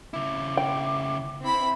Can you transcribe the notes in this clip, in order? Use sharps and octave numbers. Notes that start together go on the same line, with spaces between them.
C#3 E4 D6
G5
C4 E4 B5